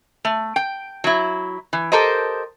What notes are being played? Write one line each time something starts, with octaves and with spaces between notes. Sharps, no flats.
A3
G5
F#3 E4
E3
G4 A4 A#4 C5 D#5